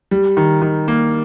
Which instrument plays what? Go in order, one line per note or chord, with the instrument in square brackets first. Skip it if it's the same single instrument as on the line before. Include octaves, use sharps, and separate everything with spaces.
[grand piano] G3
D#3
D#3
A#3